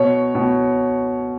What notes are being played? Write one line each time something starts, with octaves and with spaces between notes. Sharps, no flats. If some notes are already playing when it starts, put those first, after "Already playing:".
Already playing: B2 C#5
B2